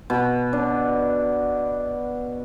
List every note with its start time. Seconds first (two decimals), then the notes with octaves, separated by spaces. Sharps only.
0.10 B2
0.53 D4